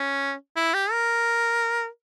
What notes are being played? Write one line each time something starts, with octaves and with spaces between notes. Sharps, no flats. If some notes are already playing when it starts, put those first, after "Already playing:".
Already playing: C#4
E4
G4
A#4